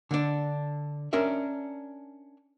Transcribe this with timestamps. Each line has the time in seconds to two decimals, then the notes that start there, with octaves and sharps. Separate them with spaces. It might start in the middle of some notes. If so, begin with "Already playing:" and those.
0.11 D3 D4
1.13 C#4 D4 A#4 E5